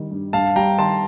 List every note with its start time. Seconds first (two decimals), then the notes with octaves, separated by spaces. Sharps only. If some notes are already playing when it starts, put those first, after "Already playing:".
Already playing: D#3 G3
0.11 G2
0.33 G2 F5 A5
0.56 G3 G5 A#5
0.78 D#3 A5 C6